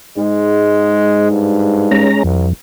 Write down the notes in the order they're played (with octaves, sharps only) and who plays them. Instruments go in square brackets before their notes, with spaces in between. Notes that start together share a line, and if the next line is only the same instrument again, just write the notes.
[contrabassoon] G#2 [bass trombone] G#3
[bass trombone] G2
[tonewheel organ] G#3 C#4 A#5
[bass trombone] C2 [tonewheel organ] F2